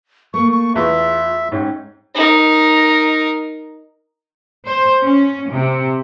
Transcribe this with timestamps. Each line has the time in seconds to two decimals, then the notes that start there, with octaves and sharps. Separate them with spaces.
0.34 A3 A#3 C#6
0.51 C#6
0.76 E2 E3 F4 G#4 E5
1.52 G#2 C#4 G5
2.15 D#4 A#4
4.66 C5
5.03 C#4
5.53 C3